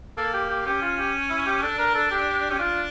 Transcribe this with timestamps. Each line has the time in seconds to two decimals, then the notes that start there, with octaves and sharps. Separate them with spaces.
0.17 A#3 A4
0.34 G4
0.50 G4
0.66 C#4 G4
0.82 F4
0.98 G4
1.30 E4
1.46 G4
1.62 D4 A4
1.79 A#4
1.95 A4
2.11 G4
2.51 C#4 G4
2.59 D4 F4